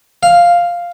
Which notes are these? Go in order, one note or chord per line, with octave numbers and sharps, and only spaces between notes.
F5